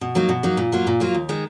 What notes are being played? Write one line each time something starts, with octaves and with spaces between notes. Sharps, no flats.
B2
F#3 A#3 D#4
B2
F#3 A#3 D#4
A#2
F#3 A#3 F4
A#2
F#3 A#3 F4
D#2
D#3 G#3